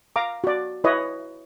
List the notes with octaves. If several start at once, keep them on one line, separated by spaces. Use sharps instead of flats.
F5 A#5 D6
F#4 D5
E4 B4 C#5 D#5